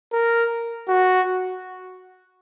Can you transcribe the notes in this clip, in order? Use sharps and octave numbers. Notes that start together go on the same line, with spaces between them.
A#4
F#4